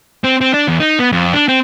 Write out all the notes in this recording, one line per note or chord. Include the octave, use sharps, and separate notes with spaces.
C4
C4
D4
E2
D#4
B3
F2
D4
C4